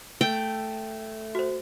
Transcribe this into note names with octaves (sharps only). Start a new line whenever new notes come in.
A3 G5
F#4 C5